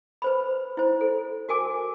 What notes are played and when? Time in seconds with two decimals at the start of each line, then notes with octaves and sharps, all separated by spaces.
0.22 B4 C5 B5
0.77 E4 C5
1.01 A4
1.49 F#4 A#4 G#5 D6